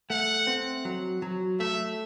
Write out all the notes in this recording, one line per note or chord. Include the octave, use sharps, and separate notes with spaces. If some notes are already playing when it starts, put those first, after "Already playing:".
A3 F#5
C4
F#3
F#3
A3 E5